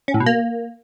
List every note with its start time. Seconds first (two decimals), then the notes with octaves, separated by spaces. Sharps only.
0.08 C#4
0.14 A2
0.20 B2
0.26 A#3